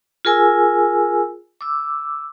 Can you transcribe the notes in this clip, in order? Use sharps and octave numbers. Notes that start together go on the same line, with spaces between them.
F4 G#4 A#4 G#5 E6
D6 E6